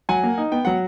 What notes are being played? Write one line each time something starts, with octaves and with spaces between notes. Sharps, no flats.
F#3 F#5 G#5
A#3
D#4
B3 G5
F#3 F#5